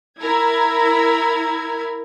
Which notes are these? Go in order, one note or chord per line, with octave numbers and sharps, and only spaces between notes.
E4 A#4 G#6